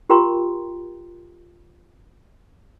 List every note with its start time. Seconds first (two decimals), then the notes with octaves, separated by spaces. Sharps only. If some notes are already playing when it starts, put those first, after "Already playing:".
0.09 F4 G4 A#4 G5 A#5 C6